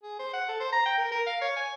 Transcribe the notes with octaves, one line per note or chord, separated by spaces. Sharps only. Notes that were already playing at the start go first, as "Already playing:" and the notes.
G#4
C5
F#5
A4
C5
A#5
G5
A#4
A#4
F5
C#5
G#5